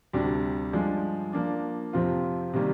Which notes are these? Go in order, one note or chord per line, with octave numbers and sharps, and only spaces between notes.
D2 C3 G3 D4 G4
G2 F3 G#3 D4
F3 A#3 D4
F2 C3 F3 C4 F4
C3 D#3 G3 A#3 F4